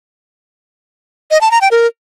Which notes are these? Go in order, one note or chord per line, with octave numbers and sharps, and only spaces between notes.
D#5
A5
A#5
G5
A#4